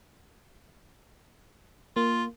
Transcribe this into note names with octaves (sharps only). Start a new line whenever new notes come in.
A#3 F4